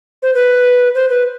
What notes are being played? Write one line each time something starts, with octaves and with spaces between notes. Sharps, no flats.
C5
B4
C5
B4